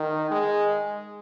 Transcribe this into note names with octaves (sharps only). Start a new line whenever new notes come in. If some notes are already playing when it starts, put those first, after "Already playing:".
Already playing: D#3
G#3